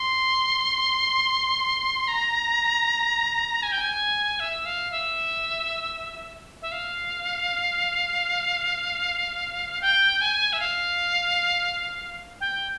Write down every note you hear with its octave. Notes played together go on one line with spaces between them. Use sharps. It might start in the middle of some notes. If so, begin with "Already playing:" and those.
Already playing: C6
A#5
G#5
G5
G#5
E5
F5
E5
E5
F5
G5
G#5
E5
F5
G5